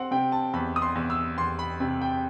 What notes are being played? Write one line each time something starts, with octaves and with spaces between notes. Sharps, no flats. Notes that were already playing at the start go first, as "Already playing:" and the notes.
Already playing: C4 F#5
C3 G5
A5
E2 B5
D#6
C6
E2
E6
E2 C6
B5
C3
G5